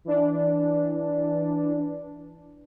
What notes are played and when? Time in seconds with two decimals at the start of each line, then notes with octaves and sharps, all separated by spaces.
0.05 E3 D4